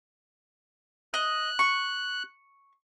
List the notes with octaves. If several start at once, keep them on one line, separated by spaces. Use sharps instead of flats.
D#5 F#6
C#6